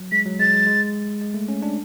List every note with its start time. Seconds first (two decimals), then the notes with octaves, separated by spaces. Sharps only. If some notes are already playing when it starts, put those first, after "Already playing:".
Already playing: F#3
0.12 G#3 B6
0.26 F#3
0.39 G#3 A6
0.53 G#3
0.67 G#3
1.21 G#3
1.34 A3
1.48 C#4
1.62 D4